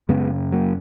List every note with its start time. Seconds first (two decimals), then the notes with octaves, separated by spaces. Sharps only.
0.09 F#2 C#3 G#3 B3
0.52 F#3 A#3